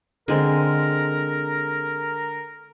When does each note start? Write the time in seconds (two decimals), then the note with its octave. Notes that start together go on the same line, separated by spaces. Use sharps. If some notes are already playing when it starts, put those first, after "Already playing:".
0.28 D3 G#3 C4 A#4